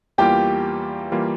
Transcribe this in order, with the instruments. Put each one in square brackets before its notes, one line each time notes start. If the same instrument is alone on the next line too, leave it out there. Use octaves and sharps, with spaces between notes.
[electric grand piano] E2 E3 G3 A#3 F4 [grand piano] G4 G5
[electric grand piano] E3 G3 A#3 F4